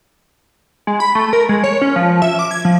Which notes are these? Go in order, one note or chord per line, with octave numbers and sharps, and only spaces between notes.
G#3
B5
A3
A#4
G#3
C#5
C#4
F3
E5
D6
G#6
F3